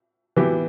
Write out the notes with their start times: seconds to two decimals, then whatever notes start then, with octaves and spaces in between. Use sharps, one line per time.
0.37 E3 B3 E4 G4